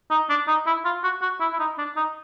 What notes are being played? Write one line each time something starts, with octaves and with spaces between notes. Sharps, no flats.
D#4
D4
D#4
E4
F4
F#4
F#4
E4
E4
D#4
D4
D#4